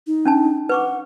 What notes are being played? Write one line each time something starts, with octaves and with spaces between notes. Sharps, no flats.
D#4
C#4 D4 A5
B4 F#5 C#6 D6